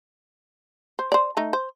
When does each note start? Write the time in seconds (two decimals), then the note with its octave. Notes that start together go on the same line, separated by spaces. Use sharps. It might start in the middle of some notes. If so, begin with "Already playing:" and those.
0.99 C5
1.12 C5 D5
1.37 A3 D#4
1.53 C5